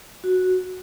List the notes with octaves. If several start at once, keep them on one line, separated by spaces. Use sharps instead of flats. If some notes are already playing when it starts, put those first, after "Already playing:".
F#4